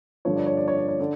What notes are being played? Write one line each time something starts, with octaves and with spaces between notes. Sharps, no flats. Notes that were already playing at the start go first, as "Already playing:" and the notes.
G2 D3 F3 C#5
D5
C#5
D5
C#5
D5
C#5
D3 D5